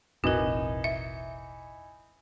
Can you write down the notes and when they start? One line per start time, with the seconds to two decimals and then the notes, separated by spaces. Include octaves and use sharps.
0.24 E1 A1 E3 C4 D#4 F#4 A#4
0.84 E5